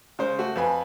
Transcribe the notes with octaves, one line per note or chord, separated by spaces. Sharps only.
C#3 G#3 C5
A3 F#4
F2 B4 G#5